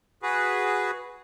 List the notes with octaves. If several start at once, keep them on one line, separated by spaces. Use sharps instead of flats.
F#4 G#4 B4